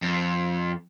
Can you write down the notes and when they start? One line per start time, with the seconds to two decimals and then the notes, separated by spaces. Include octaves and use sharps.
0.02 F2